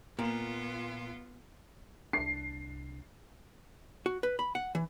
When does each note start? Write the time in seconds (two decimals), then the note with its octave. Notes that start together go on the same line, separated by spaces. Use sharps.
0.19 A#2 B3 F4
2.13 C2 D4 C7
4.06 F#4
4.23 B4
4.39 B5
4.55 F#5
4.75 E3